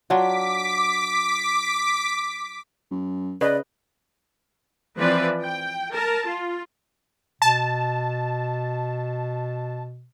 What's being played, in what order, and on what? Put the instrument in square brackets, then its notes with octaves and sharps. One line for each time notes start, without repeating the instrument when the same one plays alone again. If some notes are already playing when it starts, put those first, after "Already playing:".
[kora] F#3 D4 F4 [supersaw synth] D6 B6
[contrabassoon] F#2
[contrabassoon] C#3 [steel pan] B4 D#5 [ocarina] D5
[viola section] E3 F3 C4 B4 D5
G5
A#4 A5
F4
[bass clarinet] B2 [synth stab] A5